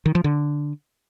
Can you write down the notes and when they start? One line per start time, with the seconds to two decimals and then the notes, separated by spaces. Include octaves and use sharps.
0.06 D#3
0.15 F3
0.24 D3